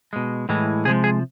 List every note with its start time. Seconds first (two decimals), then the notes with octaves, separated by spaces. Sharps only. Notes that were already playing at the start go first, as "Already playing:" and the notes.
0.13 B2 G#3
0.49 A2 E3 G#3
0.85 C3 F3 G#3 G#4
1.04 G#4